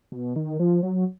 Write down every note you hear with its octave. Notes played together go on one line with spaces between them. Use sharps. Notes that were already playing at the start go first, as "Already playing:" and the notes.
B2
D#3
F3
F#3